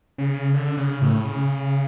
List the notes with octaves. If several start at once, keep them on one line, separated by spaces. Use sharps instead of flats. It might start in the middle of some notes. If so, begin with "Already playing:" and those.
C#3
D3
C#3
A2
C#3